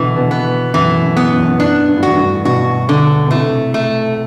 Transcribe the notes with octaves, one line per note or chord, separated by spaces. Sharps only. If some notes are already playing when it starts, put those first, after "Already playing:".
Already playing: B2 D3 E3
B2 D3
B3
F#2 A2 E3
F#2
B3
F#2
E2
F#2
F#2 D4
G2
A2
E2 G2 F#4
E2 G2
G2 B2 F#4
D3
B2
A2 C3 A3
A3